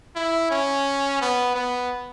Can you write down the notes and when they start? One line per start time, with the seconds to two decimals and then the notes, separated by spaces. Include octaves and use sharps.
0.16 E4
0.51 C#4
1.21 B3
1.55 B3